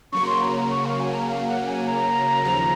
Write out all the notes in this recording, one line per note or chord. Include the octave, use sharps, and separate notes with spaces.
C#3 F#3 A#3 C#6
C6
A#5
A#5
C#6
F5
G#5
A#5
F5
F#5
G#5
A#5
D#2 C#3 F3